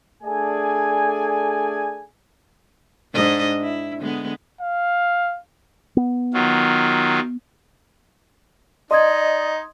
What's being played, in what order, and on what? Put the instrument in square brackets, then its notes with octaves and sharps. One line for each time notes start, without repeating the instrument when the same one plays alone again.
[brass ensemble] A3 D4 G#4 A4 D5 G#5
[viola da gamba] G#2 D4 D#5
E4
D3 G#3 B3
[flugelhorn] F5
[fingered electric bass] B3
[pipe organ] D#3 F#3 F4
[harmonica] D#4 [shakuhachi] D5 [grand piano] D#5 [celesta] C6 D#6 G#6